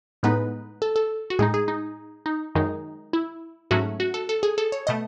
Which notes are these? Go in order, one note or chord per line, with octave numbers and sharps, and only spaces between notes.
A2 G#3 B3 D#4 B4
A4
A4
F#4
A2 G#3 D#4 G#4
G#4
D#4
D#4
F#2 D#3 G#3 D#4
E4
G#2 F#3 A3 C#4 F#4
F#4
A4
A4
G#4
A4
C#5
B2 A3 D#5